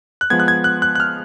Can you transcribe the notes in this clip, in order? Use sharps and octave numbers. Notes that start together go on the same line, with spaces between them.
F#6
F3 G#3 B3 G#6
F#6
G#6
F#6
F#6
F#6
F6